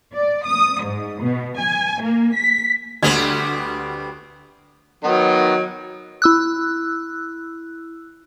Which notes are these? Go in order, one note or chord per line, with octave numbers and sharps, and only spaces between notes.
D5
D#6
G#2
B2
G#5
A#3
B6
D2 G3 B3 C4 G#6
D#3 F#3 B3 D#4
E4 E6 F#6